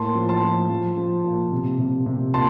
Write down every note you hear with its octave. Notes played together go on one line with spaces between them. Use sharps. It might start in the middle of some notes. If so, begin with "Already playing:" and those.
Already playing: A2 A#3 A5 C6
F3
A5 C6
F3
F3
F3
A#2
C3
C3
C3
A#2 A5 C6